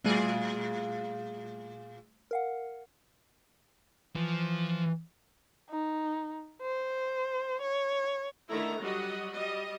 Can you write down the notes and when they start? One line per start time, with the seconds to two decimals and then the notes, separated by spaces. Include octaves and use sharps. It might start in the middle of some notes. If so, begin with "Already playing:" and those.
0.04 A#2 G3 A3 F4 G#4 D#7
2.31 A#4 F5 F#5
4.16 E3 F3
5.70 D#4
6.62 C5
7.61 C#5
8.50 D3 D#3 A3 E4 C#5 A#5
8.82 F#3 G3 F#4 D#5 F#5
9.34 G3 D#5